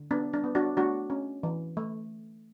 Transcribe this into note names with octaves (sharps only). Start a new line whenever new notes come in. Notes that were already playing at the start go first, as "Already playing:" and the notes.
Already playing: D3
B3 D4
D4
B3
D4 F#4
A3 D4 F#4
C#4
E3
A3